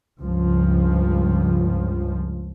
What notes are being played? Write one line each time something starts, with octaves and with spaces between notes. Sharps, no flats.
C#2 G2 F3